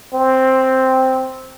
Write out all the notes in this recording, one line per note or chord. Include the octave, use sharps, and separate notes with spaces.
C4